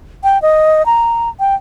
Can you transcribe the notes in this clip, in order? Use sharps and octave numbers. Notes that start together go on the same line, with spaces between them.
G5
D#5
A#5
G5